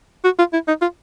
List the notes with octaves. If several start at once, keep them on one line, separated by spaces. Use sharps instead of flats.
F#4
F4
E4
D#4
F4